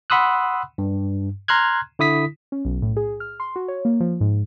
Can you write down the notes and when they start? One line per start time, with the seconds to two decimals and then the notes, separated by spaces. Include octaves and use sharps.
0.10 F#5 B5 C6 D#6 E6 F#6
0.78 G2
1.48 A#5 C6 F6 F#6 G#6
1.99 D3 E4 D#6 B6
2.52 C#4
2.65 B1
2.82 A2
2.97 G#4
3.20 F6
3.40 C6
3.56 F#4
3.68 C#5
3.85 A#3
4.00 F3
4.21 G#2